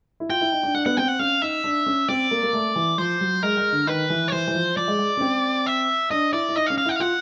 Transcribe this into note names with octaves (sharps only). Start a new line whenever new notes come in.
E4
F4 G5
E4
D#4
D4
D4 F#5
B3 F#5
C4 G5
F#5
C#4 F5
D#4 E5
D4
C#4
C4 D5
A#3
A#3
A3
E3
F3 C5
F#3
G#3 A#4
G#3
D3
D#3 B4
E3
C#5
E3 C5
E3
F3
F3 D5
G#3
G#3
C#4
C4
E5
D4 D#5
E4 D5
E4
D#4 D#5
F5
C#4
F5
E4 F#5
F5
F4 F#5